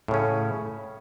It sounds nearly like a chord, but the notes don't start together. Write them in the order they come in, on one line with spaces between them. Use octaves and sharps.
A2 C#3 C#4